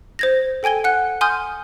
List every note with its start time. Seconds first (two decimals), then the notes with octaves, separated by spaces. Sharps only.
0.19 C5 G#6 A#6
0.63 A4 G5 G#5 G#6 G7
0.84 F#5 F#6
1.21 G#5 C6 D#6 F6 G6